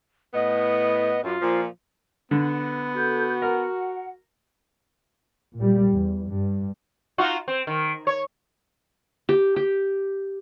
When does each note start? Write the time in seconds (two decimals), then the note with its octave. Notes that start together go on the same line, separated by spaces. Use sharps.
0.34 A2 B3 D#5
1.24 F#2 F4
1.41 A#2 F3
2.31 D3 B3
2.96 F#4 A4 G6
3.42 A#4 F#5
5.58 A#2 G3
5.92 E2
6.26 G2
7.18 D#4 F4 F#4
7.48 C4
7.67 D#3
8.07 C#5
9.29 G4
9.56 G4